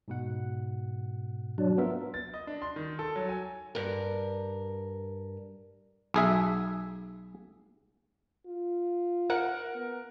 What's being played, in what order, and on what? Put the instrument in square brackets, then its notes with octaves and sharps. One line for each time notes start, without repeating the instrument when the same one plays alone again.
[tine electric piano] G#2 B2 F#5
[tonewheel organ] F#3 D4
[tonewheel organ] B3 [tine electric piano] F4 A#4 E5
[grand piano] A6
D#5
D4
C6
D#3
A4
F#3
G#5
[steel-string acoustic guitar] G2 A#4
[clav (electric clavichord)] B1 G#4 E5
[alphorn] F4
[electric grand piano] A#4 [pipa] F#5
[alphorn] B3